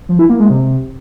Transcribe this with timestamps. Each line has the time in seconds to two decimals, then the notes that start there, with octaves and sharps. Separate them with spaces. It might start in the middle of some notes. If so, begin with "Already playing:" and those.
0.09 F3
0.19 E4
0.29 A#3
0.40 G#3
0.50 C3